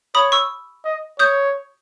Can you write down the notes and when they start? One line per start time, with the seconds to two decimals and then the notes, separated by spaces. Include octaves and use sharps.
0.15 C#5 B5 D#6
0.32 C#6 E6
0.84 D#5
1.19 C#5 D#6 G6